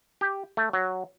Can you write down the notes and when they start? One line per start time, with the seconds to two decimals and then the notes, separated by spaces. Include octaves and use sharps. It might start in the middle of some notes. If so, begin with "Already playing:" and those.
0.21 G4
0.57 A3
0.73 F#3